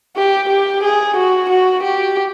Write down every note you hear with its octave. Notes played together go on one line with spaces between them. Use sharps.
G4
G4
G#4
F#4
F#4
G4